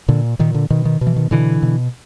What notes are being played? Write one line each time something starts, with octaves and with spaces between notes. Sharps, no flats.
A#2 D3
A#2 D#3
D3
B2 D#3
D#3
B2
E3
D#3
B2 D3 E3
B2